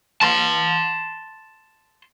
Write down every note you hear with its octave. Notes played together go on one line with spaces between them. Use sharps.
A5 C6